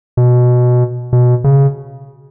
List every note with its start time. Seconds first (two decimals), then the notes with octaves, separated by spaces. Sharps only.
0.17 B2
1.13 B2
1.44 C#3